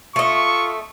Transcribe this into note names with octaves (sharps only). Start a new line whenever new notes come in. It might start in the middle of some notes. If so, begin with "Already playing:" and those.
A3 F4 D#5 C#6